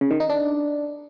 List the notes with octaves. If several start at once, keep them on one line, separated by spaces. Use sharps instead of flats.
C#3
D#3
D#4
D4